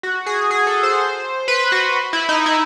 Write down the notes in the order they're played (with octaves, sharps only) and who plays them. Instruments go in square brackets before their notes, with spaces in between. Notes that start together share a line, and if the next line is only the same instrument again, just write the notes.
[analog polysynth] F#4
G#4
G#4
A4
C5
B4
F#4
E4
D#4
E4